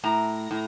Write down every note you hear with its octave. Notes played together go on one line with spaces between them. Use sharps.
A2 A#5
A2